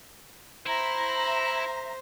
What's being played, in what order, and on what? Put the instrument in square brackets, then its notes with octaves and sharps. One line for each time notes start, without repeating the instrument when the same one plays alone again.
[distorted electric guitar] E4 [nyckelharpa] C5 [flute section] E5 A#5